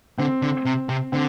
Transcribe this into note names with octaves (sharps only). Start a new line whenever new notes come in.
D3 C4
D3
C3
C3
D3 C4